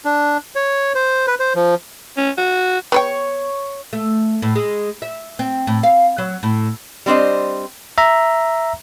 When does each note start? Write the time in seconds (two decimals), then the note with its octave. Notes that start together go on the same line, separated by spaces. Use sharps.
0.05 D4
0.55 C#5
0.95 C5
1.27 B4
1.39 C5
1.55 F3
2.17 C#4
2.38 F#4
2.92 B3 B4 C#5 G5 C#6
3.93 A3
4.42 A2
4.55 G#3
5.02 E5
5.39 C4
5.67 A2
5.83 F5
6.18 F#3
6.43 A2
7.06 G3 C4 D4 C5 D#5
7.98 E5 A#5